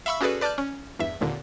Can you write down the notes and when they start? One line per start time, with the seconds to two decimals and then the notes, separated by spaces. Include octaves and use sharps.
0.06 E5 F5 B5 C#6 E6
0.21 C#4 F#4 G#4 A4 B4 D5
0.41 B4 D5 A5 D6 F6 G6
0.58 C#4
0.99 E2 G2 E5
1.21 G#1 D#2 A#2 D3